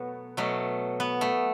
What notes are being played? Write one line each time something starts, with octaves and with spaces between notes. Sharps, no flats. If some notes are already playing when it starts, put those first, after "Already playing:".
Already playing: B2 F#3 A3 B3
B2 F#3 A3
B3
A3